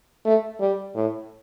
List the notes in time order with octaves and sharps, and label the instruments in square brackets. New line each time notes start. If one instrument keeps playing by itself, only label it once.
[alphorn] A3
G3
A2